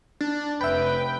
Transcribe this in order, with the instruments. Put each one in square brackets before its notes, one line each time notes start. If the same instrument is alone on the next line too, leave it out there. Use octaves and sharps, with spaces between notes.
[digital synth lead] D4
[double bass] F1 [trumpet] B4 [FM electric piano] E5 B5 [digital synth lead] G5